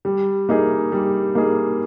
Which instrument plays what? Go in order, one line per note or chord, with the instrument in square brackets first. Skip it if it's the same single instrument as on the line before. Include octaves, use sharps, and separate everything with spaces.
[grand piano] G3
A#3 D#4 G#4
G3
A#3 D#4 G#4